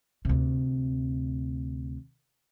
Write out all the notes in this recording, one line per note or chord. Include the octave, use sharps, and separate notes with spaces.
D2 C3